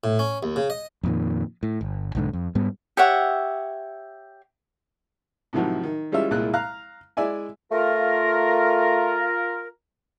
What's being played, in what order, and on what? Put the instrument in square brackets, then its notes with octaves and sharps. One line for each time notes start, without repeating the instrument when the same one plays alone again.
[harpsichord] A2
C#4
D#2
C#3
D#5
[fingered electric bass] F2 A#2 D#3
A2
G1
B1 G#2 D3
F2
G#2 G3 B3
[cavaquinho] G4 C#5 E5 F#5
[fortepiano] A2 C3 D#3 F3 F#3
D#3
E3 G3 G#3 C#4 F4 E5
C2 A#2 G#3 E4 F#6
F5 A#5 F#6
G#3 E4 D5 E5 G#5
[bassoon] A3 [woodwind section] F4 A#4